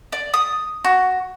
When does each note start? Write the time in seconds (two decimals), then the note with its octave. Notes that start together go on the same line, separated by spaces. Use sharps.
0.12 D5
0.34 D#6
0.84 F#4